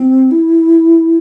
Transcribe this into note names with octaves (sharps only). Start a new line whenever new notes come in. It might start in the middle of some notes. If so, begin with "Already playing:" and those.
Already playing: C4
E4